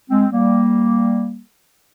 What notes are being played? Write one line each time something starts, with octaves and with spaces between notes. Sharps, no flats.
G#3 C4
G3 A#3